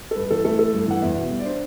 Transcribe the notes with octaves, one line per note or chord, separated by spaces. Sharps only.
A4
G2 B4
E3 A4
A3 A4
E4 A4
G2
E3 F#5
E2 E5
B2
G3
D5
D4 C5